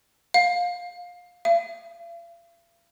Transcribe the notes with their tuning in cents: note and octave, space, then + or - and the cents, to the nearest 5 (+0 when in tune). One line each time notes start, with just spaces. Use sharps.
F5 +20
F5 -45